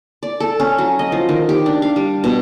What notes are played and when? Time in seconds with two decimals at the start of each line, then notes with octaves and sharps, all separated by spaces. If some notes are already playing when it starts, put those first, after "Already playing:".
0.23 D5
0.40 A4
0.60 C#4
0.78 F#3
0.99 D#5
1.12 F3
1.29 D#3
1.49 G4
1.66 D4
1.82 F5
1.96 G3
2.24 B2